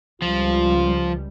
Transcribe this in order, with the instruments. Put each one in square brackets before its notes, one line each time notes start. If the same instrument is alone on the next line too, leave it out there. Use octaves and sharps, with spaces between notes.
[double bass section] C#2 G3 [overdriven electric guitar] F3 [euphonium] F4